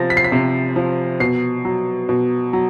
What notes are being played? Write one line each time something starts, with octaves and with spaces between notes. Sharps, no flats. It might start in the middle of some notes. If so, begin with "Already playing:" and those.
Already playing: C3 F3 A6 A#6
B6
C7
B6
C3
F3
B2 C7
F#3
B2
F#3